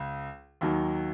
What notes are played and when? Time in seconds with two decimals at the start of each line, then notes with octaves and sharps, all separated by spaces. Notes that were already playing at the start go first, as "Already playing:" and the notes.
Already playing: C#2
0.61 D#2 D#3 F#3